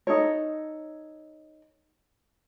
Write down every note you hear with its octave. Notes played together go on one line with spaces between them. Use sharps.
D#4 A4 C#5